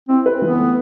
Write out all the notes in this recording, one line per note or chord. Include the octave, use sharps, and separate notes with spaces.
C4 E4
B4
E3 B3
A3